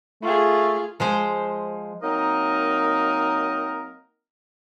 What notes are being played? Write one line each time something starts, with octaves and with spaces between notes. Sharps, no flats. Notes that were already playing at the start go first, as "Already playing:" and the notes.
A3 F4 G#4
F3 G#3 C5
F#3 A#3 C4 D#4 A#4 D#5